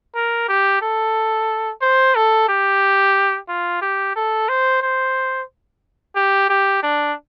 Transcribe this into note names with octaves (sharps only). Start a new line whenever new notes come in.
A#4
G4
A4
C5
A4
G4
F4
G4
A4
C5
C5
G4
G4
D4